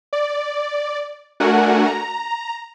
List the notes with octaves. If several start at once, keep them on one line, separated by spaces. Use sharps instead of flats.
D5
A3 D4 F#4 A#4 F#5 G#5
A#5